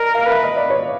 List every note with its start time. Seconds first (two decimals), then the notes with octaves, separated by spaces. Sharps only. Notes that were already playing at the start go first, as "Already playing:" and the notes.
Already playing: A#4 D5 D#5
0.15 F5
0.26 B4 E5
0.43 D#5
0.56 D5
0.70 C#5